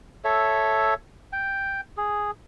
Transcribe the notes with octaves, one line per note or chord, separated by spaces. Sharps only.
A4 C#5 E5
G5
G#4